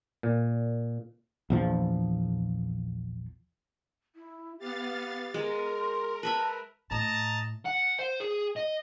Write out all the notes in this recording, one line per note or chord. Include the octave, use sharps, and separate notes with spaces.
A#2
A#1 E2 F3
E4
B3 G4 F5 A6
G#3 A#4
C6
B4 E5 A5 B5
A2 D#5 A5 A#5
F#5
C5
G#4
D#5